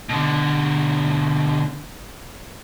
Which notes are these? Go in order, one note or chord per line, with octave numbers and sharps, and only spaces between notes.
B2 D3